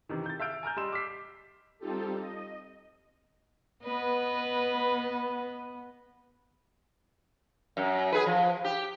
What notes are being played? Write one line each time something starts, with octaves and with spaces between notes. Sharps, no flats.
C3 D#3 E3
G6 A6
E5 F5 E6 F6 G6 D7
G#5 A#5 F6 G6
G3 D#5 C6 E6 E7
D6 F6 B6 C7
G3 C4 D#4 F4 G4 A4
D#5
B3 B4 D#5
F#2
G#4 B4
F3
G4